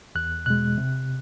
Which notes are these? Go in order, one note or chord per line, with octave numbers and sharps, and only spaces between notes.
E2 F#6
B2 G#3 F#6
C3